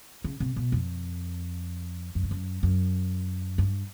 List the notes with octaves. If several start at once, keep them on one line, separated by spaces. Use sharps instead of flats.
C#3
C3
B2
F2
F#2
G2
F#2
F#2
G2